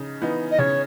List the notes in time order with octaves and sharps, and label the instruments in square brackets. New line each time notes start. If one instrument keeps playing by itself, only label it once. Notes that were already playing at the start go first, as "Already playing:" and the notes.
Already playing: [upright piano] C#3 D#4
E3 B3 D#4
[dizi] D#5
[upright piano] C#3 [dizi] C#5